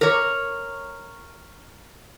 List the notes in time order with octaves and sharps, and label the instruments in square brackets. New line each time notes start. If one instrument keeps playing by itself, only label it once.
[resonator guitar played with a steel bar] A#4 C#5